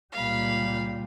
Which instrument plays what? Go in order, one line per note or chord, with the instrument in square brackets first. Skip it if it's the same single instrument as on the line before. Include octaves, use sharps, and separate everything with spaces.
[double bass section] C#2 A#2 G3 [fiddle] F5 B5